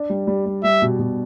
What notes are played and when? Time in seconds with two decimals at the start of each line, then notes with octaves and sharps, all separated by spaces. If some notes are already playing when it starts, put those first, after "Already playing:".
Already playing: D4
0.10 G3
0.27 G3
0.46 G3
0.64 G3 E5
0.82 B2
0.99 B2